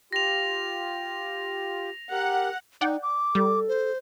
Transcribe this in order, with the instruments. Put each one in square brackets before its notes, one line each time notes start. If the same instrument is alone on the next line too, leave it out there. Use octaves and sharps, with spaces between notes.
[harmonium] F4 G4 [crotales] A#6 F7
[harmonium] G4 A#4 [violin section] F#5
[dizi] D#4 [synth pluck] D5 F#5 G5
[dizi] D6
[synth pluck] G3 [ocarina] A4
[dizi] C5